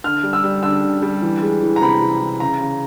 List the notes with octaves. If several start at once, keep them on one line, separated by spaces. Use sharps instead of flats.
D3 F6
G3
E6
G3
D3 E6
D3
G3
E3
G#3
E3
A#5
C3 B5
C3
E3
C#3 A#5
C#3